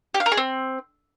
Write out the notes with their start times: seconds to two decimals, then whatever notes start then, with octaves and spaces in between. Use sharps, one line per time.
0.14 G4
0.20 F5
0.26 A#4
0.32 G#4
0.37 C4